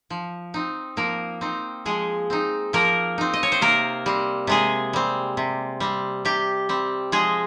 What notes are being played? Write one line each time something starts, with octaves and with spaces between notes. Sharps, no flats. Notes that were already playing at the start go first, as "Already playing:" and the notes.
F3
C4 D#4
F3 A#3 A#4
C4 D#4
F3 G#3 G#4
C4 D#4
F3 A#3 A#4
C4 D#4
D#5
C#5
C5
C3 A#3 A#4
G3 C4
C3 G#3 G#4
G3 C4
C3
G3 C4
C3 G4
G3 C4
F3 G#3 G#4